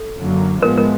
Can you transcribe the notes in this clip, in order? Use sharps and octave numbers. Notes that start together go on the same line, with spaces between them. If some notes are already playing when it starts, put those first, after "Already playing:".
Already playing: A4
F#2 D3 F#3 A#3
A2 F3 G#3 B3 A#4
A#4